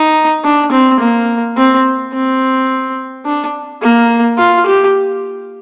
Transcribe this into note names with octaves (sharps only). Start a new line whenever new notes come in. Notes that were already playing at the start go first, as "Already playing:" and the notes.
Already playing: D#4
D4
C4
A#3
C4
C4
D4
A#3
F4
G4